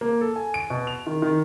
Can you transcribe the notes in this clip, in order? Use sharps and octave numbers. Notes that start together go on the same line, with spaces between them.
A#3
A4
G#5
D7
B2
F7
D#3
D#3